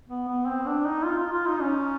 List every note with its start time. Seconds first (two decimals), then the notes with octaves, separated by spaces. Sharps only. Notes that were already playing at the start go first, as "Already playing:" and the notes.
0.09 B3
0.28 B3
0.47 C4
0.66 D4
0.86 D#4
1.04 F4
1.18 F4
1.33 F4
1.47 D#4
1.61 C#4